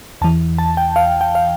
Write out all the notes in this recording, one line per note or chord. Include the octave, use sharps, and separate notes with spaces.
E2 E3 A5
A5
G5
F5
G5
F5